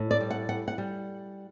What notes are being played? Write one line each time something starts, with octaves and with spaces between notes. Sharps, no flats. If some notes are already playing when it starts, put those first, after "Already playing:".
Already playing: A2
D5
G3
F#5
G3 F#5
F#5
G3